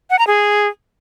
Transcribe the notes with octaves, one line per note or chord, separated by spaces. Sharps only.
F#5
A#5
G#4